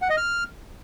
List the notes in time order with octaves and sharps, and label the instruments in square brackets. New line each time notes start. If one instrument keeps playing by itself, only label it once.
[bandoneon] F#5
D#5
F6